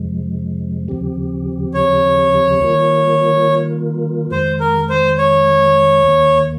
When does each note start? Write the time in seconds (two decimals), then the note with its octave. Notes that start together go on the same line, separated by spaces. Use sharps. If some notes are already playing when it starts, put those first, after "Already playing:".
Already playing: F2 C3 F3 G#3
0.88 D#2 C#3 F3 C4 G4
1.74 C#5
2.60 D#3 G3 A#3 F4 A#4
4.31 F2 D#3 G#3 C5
4.60 A#4
4.89 C5
5.18 C#5
6.03 D#2 D#3 A#3